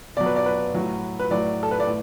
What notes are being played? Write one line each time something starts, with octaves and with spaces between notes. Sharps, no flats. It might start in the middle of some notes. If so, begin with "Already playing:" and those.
B2 F#3 D5
B4
D5
B4
A2 F#3
B4
A2 F#3 D5
A4
B4
D5
A2